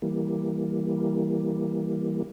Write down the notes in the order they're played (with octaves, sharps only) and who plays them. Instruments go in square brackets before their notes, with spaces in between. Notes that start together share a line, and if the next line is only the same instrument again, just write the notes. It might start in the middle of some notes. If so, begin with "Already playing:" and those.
[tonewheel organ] E3 G3 A#3